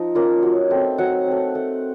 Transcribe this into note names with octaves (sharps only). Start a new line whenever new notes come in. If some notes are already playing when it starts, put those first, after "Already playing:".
Already playing: F3 D#4
A#3 C#4 F4
F#3
A3 C4
F#3 F#5
A3 C4
A3